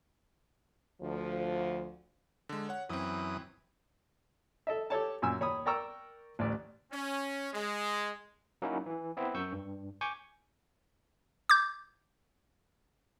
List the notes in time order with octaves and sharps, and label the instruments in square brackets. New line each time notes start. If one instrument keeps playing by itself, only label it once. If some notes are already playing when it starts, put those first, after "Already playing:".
[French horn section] D2 F3
[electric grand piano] D3 G#3
C#5 F#5
[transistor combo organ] F#2 E3 D#6 [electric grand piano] C4 E4
[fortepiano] A4 D#5 E5
G4 A4 C#5 A5
F#2 A#2 G#5 E6
D#2 C#5 B5 D#6
A#4 D5 G5 A#5 C#6 E6
A1 D2 D5
[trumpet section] C#4
G#3
[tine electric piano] F#3 A#3 C#4 D#4 E4 F#4
E3
B3 C4 E4
F#2 C#6 E6 G6
G2
G#5 C#6 D6 G6
[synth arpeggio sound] D6 G6